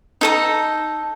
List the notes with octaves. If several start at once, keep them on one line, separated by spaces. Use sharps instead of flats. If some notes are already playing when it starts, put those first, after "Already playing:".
D#4 A4 A#5